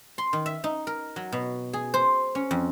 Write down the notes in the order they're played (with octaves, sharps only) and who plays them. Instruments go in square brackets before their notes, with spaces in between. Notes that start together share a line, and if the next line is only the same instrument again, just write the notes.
[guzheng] C6
D#3
E5
D#4
A#4
F#3
B2
G#4
C5
C#4
F2